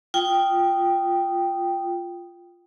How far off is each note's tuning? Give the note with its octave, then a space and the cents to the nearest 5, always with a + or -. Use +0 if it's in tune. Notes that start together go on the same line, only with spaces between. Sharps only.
F4 +0 G5 +0 D#6 +0